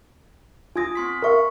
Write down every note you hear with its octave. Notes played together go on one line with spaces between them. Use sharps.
F4 G#5 D#6 G#6 A#6
C4 C6 B6
A#4 E5 F5 B5 C#6